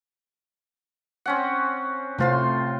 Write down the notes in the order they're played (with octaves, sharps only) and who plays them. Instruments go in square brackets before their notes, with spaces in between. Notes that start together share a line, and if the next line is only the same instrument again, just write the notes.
[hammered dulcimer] C4 C#4 F#5
[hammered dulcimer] A2 F4 C6 [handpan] C3 A3 C5